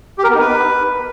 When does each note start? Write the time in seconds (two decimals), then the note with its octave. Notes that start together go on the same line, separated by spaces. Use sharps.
0.18 G4
0.24 A#4
0.29 B3
0.35 D#4
0.40 B4